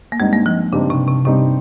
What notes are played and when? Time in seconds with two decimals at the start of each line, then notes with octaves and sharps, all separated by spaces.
0.12 A#3
0.20 G2 G3 G#3 C4 D#4
0.33 A#3
0.46 F3
0.72 G2 C#3 G3 C4 D#4
0.90 C3
1.08 C3
1.25 G2 C3 G3 C4 D#4